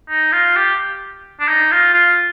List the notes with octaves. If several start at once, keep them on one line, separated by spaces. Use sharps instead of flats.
D#4
F4
G4
D4
D#4
F4
F4